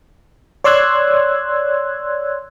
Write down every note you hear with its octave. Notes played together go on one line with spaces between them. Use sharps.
C#5 D5 C6 E6 F#6 G#6